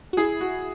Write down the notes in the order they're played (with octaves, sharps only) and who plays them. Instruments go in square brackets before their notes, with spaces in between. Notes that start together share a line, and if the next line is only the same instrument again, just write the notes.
[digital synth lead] F#4
[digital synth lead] E4 [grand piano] G#4
[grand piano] F#4